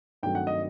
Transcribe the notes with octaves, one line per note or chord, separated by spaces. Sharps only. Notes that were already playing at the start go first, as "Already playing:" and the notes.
G2 D#3 F#3 A3 C4 G5
F#5
D#5